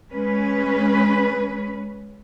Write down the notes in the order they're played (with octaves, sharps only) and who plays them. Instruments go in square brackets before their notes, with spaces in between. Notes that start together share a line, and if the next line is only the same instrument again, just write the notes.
[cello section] G#3 C#4 B4